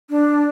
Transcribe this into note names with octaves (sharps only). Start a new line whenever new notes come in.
D4